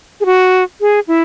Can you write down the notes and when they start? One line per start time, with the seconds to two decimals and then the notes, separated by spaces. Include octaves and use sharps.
0.21 G#4
0.26 F#4
0.81 G#4
1.08 E4